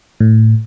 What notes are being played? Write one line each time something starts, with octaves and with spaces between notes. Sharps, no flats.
A2